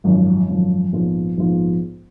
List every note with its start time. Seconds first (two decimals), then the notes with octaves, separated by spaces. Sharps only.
0.04 G#1 F#2 F3
0.48 G#1 F#2 F3
0.93 A#1 G#2 F3 B3 F4
1.38 A#1 G#2 F3 B3 F4